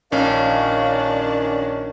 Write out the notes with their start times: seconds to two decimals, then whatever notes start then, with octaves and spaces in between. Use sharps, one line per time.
0.12 A#1 D#3 C#4 D4 F5